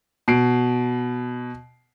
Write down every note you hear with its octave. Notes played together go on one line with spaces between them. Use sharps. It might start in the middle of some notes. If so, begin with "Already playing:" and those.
B2 C7 D7